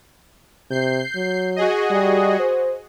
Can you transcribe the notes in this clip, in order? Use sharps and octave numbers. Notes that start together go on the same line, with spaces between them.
C3 G6 C7
F#3
F#4 G#4 D#5
G3
C5